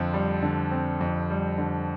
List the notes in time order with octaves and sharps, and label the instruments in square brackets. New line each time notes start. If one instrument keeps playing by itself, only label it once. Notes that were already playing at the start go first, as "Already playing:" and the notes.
Already playing: [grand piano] F2 D3 C4
G3
D3
C4
F2
G3
D3